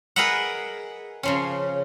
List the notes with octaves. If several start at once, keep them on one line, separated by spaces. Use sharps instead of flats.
G#4 A#4 B4 D#5 E5 F#5
C#3 F3 C#4